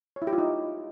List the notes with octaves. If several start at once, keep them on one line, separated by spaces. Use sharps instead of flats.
C#5
E4
G4
F4
D#4